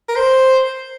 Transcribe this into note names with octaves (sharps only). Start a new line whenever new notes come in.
A#4
C5